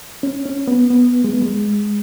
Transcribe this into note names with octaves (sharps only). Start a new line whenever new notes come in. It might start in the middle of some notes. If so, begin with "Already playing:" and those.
C#4
C#4
B3
B3
G#3
B3
G#3